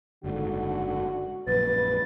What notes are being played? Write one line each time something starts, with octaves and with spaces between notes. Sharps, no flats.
F#1 G#2 D3 F#4
A#1 F#2 B4 A6